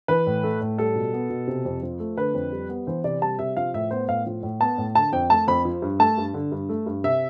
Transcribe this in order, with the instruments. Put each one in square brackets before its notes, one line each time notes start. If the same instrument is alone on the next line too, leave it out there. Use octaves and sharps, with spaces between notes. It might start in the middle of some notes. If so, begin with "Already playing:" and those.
[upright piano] E3 B4
A2
A3
A2
G3 A4
B2
B3
B2
C3
F2
F3
A3
D3 B4
F2
G3
B3
E3 C5
C3 D5
G3 A5
C3 E5
F3 F5
A2 E5
B3 C5
A2 F5
F3
A2
B3 A5
A2
D3 A5
F2 G5
A3 A5
F2 B5
F3
G2
A3 A5
G2
D3
G2
A3
G2
C3 E5